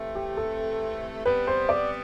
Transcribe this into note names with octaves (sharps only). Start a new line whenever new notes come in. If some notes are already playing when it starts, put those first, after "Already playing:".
Already playing: C3 E3 A3 C4
G4
A4
C3 G3 B3 B4
C5
D5